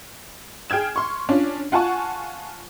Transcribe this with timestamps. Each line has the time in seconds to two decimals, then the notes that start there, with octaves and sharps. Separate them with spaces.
0.70 G#4 G5 F6 G#6 E7
0.96 C6 C#6
1.29 C#4 D4 F4
1.72 F4 F#5 G#5 A5 C#6